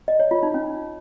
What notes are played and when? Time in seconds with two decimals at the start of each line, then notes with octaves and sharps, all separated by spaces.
0.08 D#5
0.20 C#5
0.31 F4
0.43 D#4
0.54 C#4